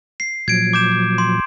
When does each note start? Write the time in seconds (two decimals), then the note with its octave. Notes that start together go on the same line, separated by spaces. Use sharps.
0.20 C7
0.48 A#2 F3 F#3 G#6 D7
0.73 D6 G6 E7
1.18 C6